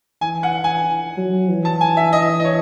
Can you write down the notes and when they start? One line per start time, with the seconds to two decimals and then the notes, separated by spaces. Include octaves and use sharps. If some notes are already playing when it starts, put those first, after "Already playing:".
0.21 E3 G#5
0.43 F#5
0.64 G#5
1.17 F#3
1.49 E3
1.65 A5
1.81 G#5
1.97 E5
2.13 D#5
2.40 D#5
2.45 C#5